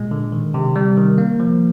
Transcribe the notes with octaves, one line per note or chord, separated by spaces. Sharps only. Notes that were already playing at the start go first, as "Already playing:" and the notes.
Already playing: A#2 G#3
D3
D#3
C3
G3
D#3
A#3
F3